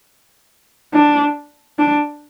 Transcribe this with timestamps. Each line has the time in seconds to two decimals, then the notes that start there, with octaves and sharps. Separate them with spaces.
0.94 D4
1.79 D4